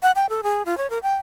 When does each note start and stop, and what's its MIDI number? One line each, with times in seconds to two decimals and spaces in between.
0.02 0.11 78
0.16 0.26 79
0.29 0.41 69
0.43 0.63 68
0.65 0.77 65
0.78 0.89 73
0.90 0.99 70
1.03 1.16 79